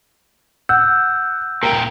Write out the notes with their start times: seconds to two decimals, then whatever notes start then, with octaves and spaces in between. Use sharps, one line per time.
0.69 F#5 E6 F#6 G6
1.63 A#2 A#4 G5